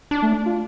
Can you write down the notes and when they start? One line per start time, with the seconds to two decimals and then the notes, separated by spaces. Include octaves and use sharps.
0.11 D4
0.22 A3
0.46 F4